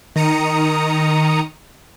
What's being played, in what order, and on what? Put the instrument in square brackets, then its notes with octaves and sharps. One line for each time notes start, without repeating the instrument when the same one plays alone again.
[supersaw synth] D#3 A#5 D#6 C#7